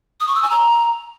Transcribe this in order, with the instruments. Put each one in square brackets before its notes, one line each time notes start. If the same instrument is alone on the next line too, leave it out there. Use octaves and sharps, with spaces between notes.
[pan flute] D#6
C#6
E6
G#5
A#5